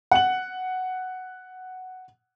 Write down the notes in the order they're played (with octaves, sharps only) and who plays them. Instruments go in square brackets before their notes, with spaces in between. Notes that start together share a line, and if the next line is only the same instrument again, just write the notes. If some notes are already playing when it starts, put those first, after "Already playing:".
[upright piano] F#5 F#7